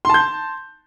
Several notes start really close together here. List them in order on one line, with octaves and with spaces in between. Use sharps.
C6 A5 G6